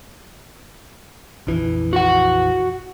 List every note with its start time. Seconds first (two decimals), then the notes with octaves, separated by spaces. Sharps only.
1.47 A#1 F2 E3
1.93 F#4 F#5